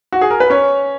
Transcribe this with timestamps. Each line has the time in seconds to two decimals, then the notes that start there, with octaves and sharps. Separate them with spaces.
0.12 F#4
0.21 G#4
0.30 A#4
0.40 B4
0.50 C#4 C#5